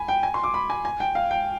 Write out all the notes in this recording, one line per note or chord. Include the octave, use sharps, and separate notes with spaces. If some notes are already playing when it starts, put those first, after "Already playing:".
Already playing: G#5 B5
G5
G#5
C6
D6
B5
G#5
G#5
G5
F5
G5